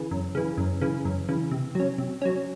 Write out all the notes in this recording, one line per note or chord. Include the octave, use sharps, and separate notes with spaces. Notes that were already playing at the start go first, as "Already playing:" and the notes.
Already playing: C#3 E3
F#2
C#3 E3
F#2
C#3 E3
F#2
C#3 E3
C3
F#3 C#4
C3
F#3 C#4